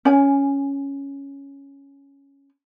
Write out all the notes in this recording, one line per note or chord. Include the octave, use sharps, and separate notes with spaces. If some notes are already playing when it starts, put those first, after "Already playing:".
C#4 G#5